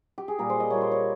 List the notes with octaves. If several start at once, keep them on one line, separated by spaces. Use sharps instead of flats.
G4
G#4
A#2 G3 A#3 A#4
C5
D#5
A#2 G3 A#3 C#5
C5
C#5